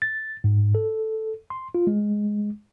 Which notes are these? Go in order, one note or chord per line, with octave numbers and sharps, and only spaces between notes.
A6
G#2
A4
C6
F4
G#3